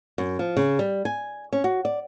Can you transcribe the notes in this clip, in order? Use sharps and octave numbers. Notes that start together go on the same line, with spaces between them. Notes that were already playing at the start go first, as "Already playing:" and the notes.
F#2
F3
C#3
G3
G#5
C#4
F#4
D5